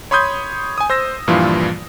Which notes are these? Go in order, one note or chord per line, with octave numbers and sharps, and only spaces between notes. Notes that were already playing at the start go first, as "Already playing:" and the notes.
C#5 B5 C6 D#6 G6 G#6
G#5 D#6
C5 E6 A#6
G2 A#2 E3 F3 E4 F4